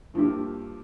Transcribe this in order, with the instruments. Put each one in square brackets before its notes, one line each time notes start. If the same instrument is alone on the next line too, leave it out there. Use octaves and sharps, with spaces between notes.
[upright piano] G2 F3 A#3 E4 G4